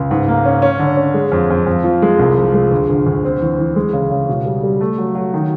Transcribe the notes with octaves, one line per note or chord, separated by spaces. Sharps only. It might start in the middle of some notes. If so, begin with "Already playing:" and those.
Already playing: C#2
G#2
A#3
C#4
C#4
D3
C#4
G#3
F2
F2
F2
F3
G#3
C2
F3
G#3
D2
D2
D2
C4
E3
E3
G#3
C#3
C#3
B2
G3
G3
A3
F#3
F#3
D#3